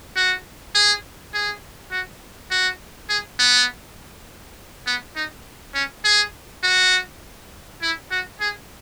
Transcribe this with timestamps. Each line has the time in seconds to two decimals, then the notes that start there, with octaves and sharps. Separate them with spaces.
0.16 F#4
0.75 G#4
1.34 G#4
1.91 F#4
2.51 F#4
3.09 G#4
3.39 B3
4.87 B3
5.16 D#4
5.74 C#4
6.04 G#4
6.63 F#4
7.82 E4
8.11 F#4
8.40 G#4